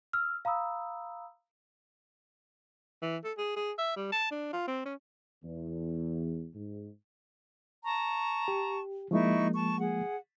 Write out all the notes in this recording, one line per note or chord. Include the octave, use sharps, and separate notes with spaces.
E6 F6
F5 A#5 B5 D#6 E6
E3
A4
G#4
G#4
E5
G3
A5
D4
F4
C4
C#4
E2
G#2
A5 A#5 C#6
G4
F3 G#3 A#3 D#4 E4 C#6
A5 C#6
G#4 F#5